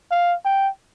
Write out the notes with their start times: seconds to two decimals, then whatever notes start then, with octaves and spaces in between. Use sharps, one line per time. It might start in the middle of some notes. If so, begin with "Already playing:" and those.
0.11 F5
0.45 G5